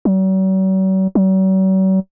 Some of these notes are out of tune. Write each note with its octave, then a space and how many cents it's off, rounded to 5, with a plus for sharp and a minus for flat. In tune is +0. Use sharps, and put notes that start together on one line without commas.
F#3 +45
F#3 +45